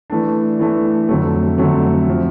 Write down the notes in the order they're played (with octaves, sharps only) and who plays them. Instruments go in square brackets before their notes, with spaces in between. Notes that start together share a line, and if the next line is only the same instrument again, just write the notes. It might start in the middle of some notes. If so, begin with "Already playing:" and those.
[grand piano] E3 A3 D4
E3 A3 D4
F2 D3 F#3 A3
F2 D3 F#3 A3
C3 F3